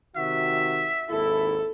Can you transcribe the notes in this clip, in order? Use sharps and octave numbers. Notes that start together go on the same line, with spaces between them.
C3 D#3 F#4 E5
G#1 D#2 E4 A4